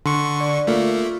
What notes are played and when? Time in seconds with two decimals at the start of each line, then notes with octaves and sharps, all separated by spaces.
0.06 D3 C6 C#6
0.40 D5
0.67 A3 A#3 F4